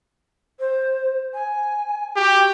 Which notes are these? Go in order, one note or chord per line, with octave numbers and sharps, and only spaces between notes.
C5
G#5
F#4 G4